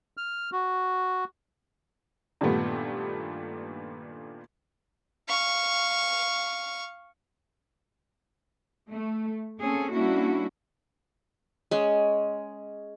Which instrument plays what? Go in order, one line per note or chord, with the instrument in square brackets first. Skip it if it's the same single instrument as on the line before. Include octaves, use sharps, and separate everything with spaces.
[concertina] F6
F#4
[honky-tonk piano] G2 A#2 D#3 G3 A3 B3
[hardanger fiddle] F5 C#6
[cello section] A3
A#3 C4 C#4 G#4 A4
G3 A#3 C#4 D4 E4 F#4
[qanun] G#3 C#4